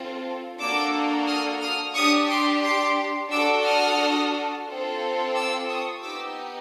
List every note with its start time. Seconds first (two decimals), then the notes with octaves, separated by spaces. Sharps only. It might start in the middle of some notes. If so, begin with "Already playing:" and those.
Already playing: C4 F4 A4
0.59 A#3 D4 F#4 A4 D6 E6
1.27 D#6 F6
1.61 D#6 F6
1.95 D4 G4 C#6 D#6
2.29 C6 D6
2.63 C6 D6
3.31 D4 F#4 A4 D6 E6
3.65 D#6 F6
4.67 C4 F4 A4
5.34 D6 E6
5.69 C#6 D#6
6.02 B3 D#4 G4 D6 E6